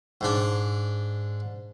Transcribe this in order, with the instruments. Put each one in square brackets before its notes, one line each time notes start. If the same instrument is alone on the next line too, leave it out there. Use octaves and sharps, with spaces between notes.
[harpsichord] G#2 D4